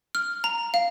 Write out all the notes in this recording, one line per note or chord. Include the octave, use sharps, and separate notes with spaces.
F6
A#5
F5